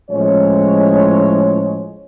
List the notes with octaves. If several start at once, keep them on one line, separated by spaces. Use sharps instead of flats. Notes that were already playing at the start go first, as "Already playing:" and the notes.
A2 F3 G#3 C#4 C#5